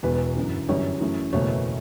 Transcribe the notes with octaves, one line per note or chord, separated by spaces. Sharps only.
E1 E2 B2 B4
G1 F#2 E3
G1 F#2 E3 G3 C#5
F#2 E3 A3
F#1 E2 B2 A3 C#5